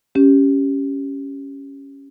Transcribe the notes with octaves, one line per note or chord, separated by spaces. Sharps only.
C#4 G4